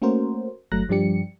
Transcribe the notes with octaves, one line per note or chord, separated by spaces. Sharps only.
A3 A#3 C#4 F#4 A#4 C5
G1 F#3 A3 A#5 F#6 A#6
G2 F3 G3 D4 G4 C#7